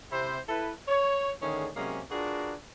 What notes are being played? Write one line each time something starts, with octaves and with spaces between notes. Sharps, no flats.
C3 E4 C5
E4 A4 B4
C#5
D3 D#3 A3 C#4 G#4
C3 F#3 G#3 A#3 C#4
D4 F4 F#4 G#4 A#4 B4